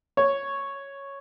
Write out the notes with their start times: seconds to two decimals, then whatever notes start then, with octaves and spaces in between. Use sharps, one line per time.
0.17 C#5